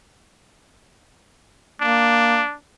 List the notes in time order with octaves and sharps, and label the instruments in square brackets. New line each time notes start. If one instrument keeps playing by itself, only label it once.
[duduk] A#3 [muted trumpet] D4